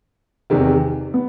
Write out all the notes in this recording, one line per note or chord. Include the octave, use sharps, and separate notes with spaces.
E2 C3 D#3
B3